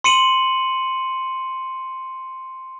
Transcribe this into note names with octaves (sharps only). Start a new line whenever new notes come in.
C6 C#7 D#7 F#7